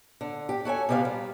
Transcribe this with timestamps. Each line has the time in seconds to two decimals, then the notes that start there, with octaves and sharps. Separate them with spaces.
0.21 D3
0.49 G4
0.65 F#4 A4 C#5 G#5
0.89 C3 B3 G4 D5 F5
1.05 G3